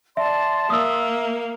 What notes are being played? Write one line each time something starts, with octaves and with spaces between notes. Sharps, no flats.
D5 E5 A5 C6
A#3 E5 D#6 E6